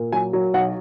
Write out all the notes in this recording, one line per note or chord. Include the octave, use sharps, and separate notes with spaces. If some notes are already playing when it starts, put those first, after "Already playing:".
Already playing: A#2
F#3 G#5
F#3
B1 F#5